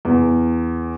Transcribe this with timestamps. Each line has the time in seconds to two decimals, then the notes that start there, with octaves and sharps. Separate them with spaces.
0.05 E2